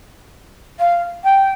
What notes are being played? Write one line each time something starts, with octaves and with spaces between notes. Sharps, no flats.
F5
G5